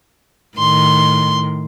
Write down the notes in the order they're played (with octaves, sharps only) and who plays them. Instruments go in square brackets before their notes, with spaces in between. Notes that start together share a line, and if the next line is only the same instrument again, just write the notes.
[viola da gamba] A2 D#3 [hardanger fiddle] C6